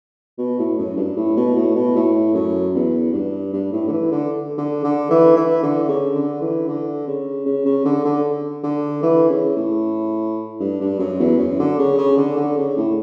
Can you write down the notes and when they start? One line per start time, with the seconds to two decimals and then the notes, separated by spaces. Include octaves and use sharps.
0.38 B2
0.59 A2
0.78 F#2
0.97 G2
1.17 A2
1.37 B2
1.56 A2
1.75 B2
1.96 A2
2.34 F#2
2.75 E2
3.13 G2
3.53 G2
3.72 A2
3.88 D3
3.92 E3
4.12 D3
4.58 D3
4.84 D3
5.10 E3
5.36 E3
5.63 D3
5.88 C#3
6.15 D3
6.41 E3
6.68 D3
7.07 C#3
7.46 C#3
7.66 C#3
7.85 D3
8.05 D3
8.63 D3
9.03 E3
9.30 C#3
9.56 A2
10.60 G2
10.80 G2
10.99 F#2
11.20 E2
11.39 F#2
11.59 D3
11.79 C#3
11.98 C#3
12.18 D3
12.37 D3
12.57 C#3
12.77 A2